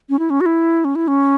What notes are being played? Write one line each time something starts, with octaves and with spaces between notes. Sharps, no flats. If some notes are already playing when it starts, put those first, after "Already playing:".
C#4
E4
C#4
F#4
E4
C#4
E4
C#4